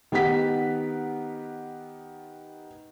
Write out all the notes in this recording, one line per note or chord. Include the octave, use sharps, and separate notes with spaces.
D#3 B3 G4 F#5 B6